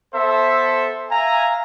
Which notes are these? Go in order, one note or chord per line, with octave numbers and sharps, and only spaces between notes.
B3 A4 C5 E5
E5 F5 G#5 A#5